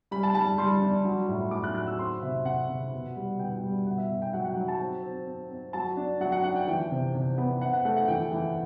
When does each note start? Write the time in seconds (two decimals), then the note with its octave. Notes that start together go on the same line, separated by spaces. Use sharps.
0.11 G3 B5
0.23 A5
0.35 G3 A5
0.58 G3 C6
0.81 D4
1.05 F#3
1.28 A2
1.51 A2 D6
1.64 F#6
1.75 F#3 F#6
1.87 E6
1.99 C4 C6
2.22 C3 E5
2.45 C3 F#5
2.69 C3
2.93 B2
3.16 G3
3.39 B2 G5
3.63 G3
3.86 B2 F#5
3.98 E5
4.10 B2
4.22 G5
4.33 F#3 F#5
4.45 F#5
4.56 F#3
4.68 A5
4.80 C4
5.03 C4
5.27 C4
5.50 C4
5.73 F#3 A5
5.97 D4
6.21 F#3 F#5
6.32 F#5
6.44 D4 F#5
6.56 G5
6.68 E3 G5
6.91 C3
7.14 C3
7.38 B3
7.61 C4 F#5
7.73 F#5
7.85 A3 F#5
7.96 F#5
8.08 E3 G5
8.31 E3